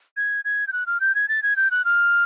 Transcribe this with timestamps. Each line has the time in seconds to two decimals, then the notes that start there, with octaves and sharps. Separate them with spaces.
0.17 G#6
0.45 G#6
0.67 G6
0.73 F#6
0.87 F6
1.01 G6
1.15 G#6
1.29 A6
1.43 G#6
1.57 G6
1.71 F#6
1.85 F6